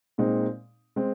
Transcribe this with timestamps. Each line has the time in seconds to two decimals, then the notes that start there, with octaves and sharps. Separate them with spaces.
0.18 A#2 G#3 C4 D#4
0.96 G#3 C4